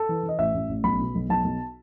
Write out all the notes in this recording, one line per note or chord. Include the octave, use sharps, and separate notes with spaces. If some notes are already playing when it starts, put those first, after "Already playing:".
Already playing: A4
E3
E3
D#5
A1 E5
A1
A1
B1 B5
B2
B1
B1 A5
B1